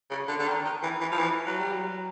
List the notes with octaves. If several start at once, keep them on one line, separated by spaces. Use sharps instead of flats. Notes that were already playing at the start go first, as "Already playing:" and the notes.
C#3
D3
D3
D#3
D#3
E3
E3
F3
E3
F#3
G3
F#3